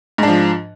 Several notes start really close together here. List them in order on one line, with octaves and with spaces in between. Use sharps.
G#2 D4 F3